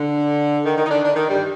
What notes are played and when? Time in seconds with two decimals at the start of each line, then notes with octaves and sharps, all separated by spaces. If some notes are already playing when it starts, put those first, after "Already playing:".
Already playing: D3
0.64 D#3
0.77 D#3
0.85 D#4
0.89 D3 D4
1.03 D3 D4
1.16 D#3
1.29 G2 G3